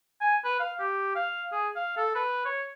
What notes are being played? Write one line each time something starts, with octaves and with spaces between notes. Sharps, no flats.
G#5
B4
F5
G4
F5
G#4
F5
A4
B4
C#5